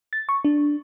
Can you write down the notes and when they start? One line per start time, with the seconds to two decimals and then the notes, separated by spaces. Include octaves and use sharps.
0.13 A6
0.29 C#6
0.45 D4